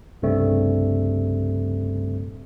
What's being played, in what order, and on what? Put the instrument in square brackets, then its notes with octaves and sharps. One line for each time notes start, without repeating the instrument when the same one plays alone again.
[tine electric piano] C2 G2 C#3 G3 A3 C4